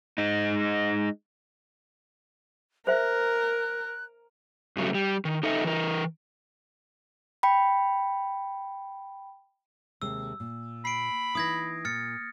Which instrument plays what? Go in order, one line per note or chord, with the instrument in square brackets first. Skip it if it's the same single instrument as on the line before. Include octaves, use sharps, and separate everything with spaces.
[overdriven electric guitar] G#3 D#4
[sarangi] A#4 [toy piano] C5 E5 [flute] F#6
[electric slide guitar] G2 C#3 F#3 A3
G3
D#3
D#4 A4 D#5 E5
E3 A#4
[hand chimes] G5 B5
[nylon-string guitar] D#2 C3 G#3 [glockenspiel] E6
[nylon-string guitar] A#2
[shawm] B5 [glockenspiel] C7 D7
[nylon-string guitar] E3 D#4 E4 [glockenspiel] D#6 G#6 A#6
[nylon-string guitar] A#2 [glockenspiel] F6 A6 C#7